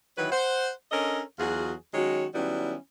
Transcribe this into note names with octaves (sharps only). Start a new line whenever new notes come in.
D#3 E3 F#3 B4
C5 F#5
C#4 D4 A4 A#4 C#5 D#5
E2 F#3 F4 F#4 G#4
D#3 F#3 G#3 C#4 F#4 C#5
D#3 F#3 G3 B3 C#4 E4